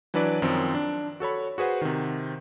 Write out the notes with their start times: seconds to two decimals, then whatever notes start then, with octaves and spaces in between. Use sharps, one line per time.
0.14 E3 F#3 D4 B4 D5
0.42 F#2 D#3 F3 C4
0.75 D4
1.20 F#4 A4 C#5 B5
1.58 F#4 G#4 B4 C5 F#5
1.82 C3 D#3